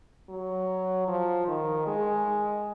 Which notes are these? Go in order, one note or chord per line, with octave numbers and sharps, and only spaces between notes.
F#3
F3
D#3
G#3